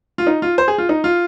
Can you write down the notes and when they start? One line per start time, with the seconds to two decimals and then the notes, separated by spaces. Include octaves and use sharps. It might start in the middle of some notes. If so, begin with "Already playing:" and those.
0.18 F4
0.27 D#4
0.42 F4
0.58 C5
0.68 G#4
0.78 F4
0.89 D#4
1.04 F4